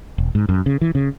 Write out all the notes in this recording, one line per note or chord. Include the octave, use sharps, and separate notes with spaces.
E1
G#2
F#2
C#3
E3
C#3